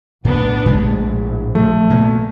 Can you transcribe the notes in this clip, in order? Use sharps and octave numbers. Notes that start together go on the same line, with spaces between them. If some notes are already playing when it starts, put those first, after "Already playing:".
B1 A2 B3 D4
A#1 A2 G#3 D4
F3 A3
A#2 A#3 B3